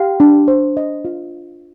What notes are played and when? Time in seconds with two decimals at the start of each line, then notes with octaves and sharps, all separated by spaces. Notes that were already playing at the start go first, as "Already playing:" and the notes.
Already playing: G4 F5 G5
0.20 D4
0.48 C5
0.77 D#5
1.05 F4